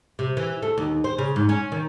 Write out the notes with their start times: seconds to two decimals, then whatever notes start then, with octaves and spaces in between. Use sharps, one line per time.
0.19 C3
0.37 E3
0.62 A3
0.78 D#2
1.04 C5
1.18 C#3
1.36 G#2
1.49 C#4
1.72 D#3